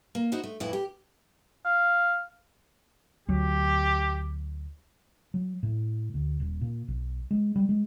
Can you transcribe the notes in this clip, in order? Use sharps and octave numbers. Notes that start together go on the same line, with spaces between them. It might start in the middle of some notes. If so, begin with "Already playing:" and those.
A#3
D#4 E4 F#4 C5
A3
F2 A2 E3 E4
G4
F5
D2 F#3 G4
F#3
A2
D2
D#1
A#2
B1
G#3
G3
G#3